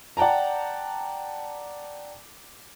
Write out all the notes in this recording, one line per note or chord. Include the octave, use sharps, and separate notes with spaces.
D5 F#5 G5 A5 A#5